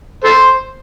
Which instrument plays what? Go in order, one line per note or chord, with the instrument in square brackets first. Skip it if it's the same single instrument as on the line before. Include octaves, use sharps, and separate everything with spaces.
[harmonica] A4 C5